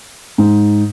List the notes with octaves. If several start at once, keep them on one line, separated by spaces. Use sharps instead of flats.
G#2